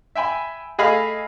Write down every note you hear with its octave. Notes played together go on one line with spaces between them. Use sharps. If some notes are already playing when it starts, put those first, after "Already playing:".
E5 G5 G#5 B5
A3 G#4 D#5 F5 B5 F6